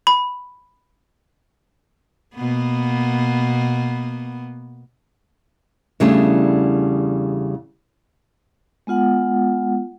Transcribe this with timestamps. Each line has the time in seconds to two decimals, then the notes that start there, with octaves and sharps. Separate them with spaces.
0.07 B5
2.35 B2 A#3 B3
6.00 E2 C#3 G3 A3 D4
8.87 G#3 B3 F4 F#5